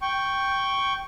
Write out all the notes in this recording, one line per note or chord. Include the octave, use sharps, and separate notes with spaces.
G5 C#6